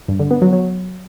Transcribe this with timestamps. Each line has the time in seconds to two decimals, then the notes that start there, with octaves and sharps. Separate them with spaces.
0.08 G2
0.20 D3
0.31 B3
0.42 F#3
0.53 F#3